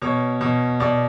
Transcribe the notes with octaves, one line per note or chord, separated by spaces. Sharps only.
B2 C#5
B2
B2 D5